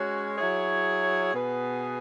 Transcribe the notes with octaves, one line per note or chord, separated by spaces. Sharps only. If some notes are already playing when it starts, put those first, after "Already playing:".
Already playing: G#3 C#4 F#4 C#5
F#3 E4 G#4 C#5
B2 B3 G#4 B4